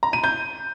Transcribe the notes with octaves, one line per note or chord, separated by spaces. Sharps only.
A#5
D#7
G6